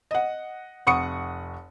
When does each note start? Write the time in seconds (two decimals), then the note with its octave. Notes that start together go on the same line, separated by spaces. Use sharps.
0.11 D#5 F#5
0.87 F1 F#5 C#6 D#6 C#7